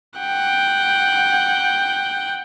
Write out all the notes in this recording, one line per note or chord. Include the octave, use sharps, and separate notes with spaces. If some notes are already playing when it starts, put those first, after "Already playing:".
F#5 G5